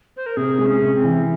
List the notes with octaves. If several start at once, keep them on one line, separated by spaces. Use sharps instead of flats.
C5
A#4
C3 G#4
G#3
C#4
C3
C4
E3